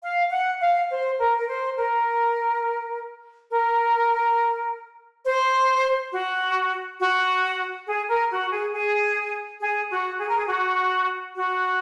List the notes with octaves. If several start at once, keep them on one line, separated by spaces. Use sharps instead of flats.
F5
F#5
F5
C5
A#4
A#4
C5
A#4
A#4
C5
F#4
F#4
G#4
A#4
F#4
G#4
G#4
G#4
F#4
G#4
A#4
G#4
F#4
F#4